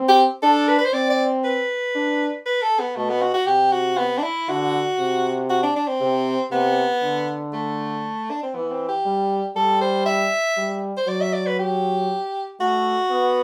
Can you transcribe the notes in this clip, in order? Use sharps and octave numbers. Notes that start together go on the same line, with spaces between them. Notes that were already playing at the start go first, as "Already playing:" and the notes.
Already playing: C4
G4
D4 A4
B4
B4
C5
C4 D5
D5
B4
D4
B4
A4
B3
B2 A3
B3
F#4
F#4
C3 G4
F#4
B3
D4
E4
D3 F#4
C3
F#4
D4
D4
C4
C3
C3 B3
D3
A3
D4
C4
E3 B3
C4
G4
G3
G3 A4
C5
E5
G3
C5
F#3 D5
E5
D5
B4
G4
A3 F#4
B3